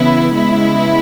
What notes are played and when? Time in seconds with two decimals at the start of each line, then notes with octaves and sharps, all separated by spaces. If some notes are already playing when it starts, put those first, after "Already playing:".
Already playing: C#3 E3 B3 E4
0.35 C#3 G#3 B3 E4